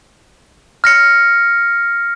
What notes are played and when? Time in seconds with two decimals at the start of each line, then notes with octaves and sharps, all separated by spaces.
0.84 F6 A#6 C#7